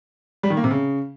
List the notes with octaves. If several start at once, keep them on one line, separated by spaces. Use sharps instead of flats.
G3
D#3
A#3
C3
C#3